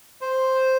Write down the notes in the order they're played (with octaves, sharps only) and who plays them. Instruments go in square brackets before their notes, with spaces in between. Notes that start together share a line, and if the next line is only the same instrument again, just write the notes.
[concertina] C5